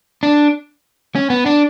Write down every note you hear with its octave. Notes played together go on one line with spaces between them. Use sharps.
D4
C#4
B3
D4